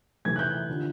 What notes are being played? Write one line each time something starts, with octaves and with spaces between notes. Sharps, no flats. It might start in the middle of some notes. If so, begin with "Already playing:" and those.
C3 E3 A3 G#6
F#6
G6
D3 F3